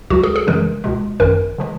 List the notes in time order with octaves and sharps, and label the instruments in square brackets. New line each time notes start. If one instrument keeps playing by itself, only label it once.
[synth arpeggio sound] C#2 C#3 F#3 F#4
G#4
G#4
F#2 C#3 E3 G#3 A#4
C#2 B2 G#3
G#1 F#2 D#3 A#4
C#3 E3 G#3